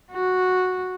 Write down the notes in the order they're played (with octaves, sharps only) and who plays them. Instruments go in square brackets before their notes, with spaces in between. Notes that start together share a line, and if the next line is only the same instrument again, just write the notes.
[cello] F#4